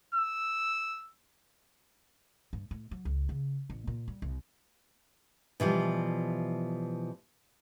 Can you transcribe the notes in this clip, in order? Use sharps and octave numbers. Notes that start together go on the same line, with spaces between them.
E6
G2
A2
F#3
C#2
C#3
A1
A#2
G3
C2
B2 E3 F3 G3